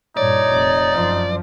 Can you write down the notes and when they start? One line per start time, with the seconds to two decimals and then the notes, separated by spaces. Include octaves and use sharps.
0.17 G2 A#2 D#4 C#5 D5
0.51 F1
0.93 F#2 F3